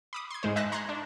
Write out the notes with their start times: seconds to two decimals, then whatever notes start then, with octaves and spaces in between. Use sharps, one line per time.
0.13 B5 D6 D#6
0.30 C6 G#6
0.43 G#2 G#3 C5
0.56 D#5 E5 A5 F#6 A#6
0.72 A#5 C6 F#6 G#6
0.89 D4